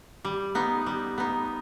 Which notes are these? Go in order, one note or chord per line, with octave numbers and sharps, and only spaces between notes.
G3
B3 D#4
G3
B3 D#4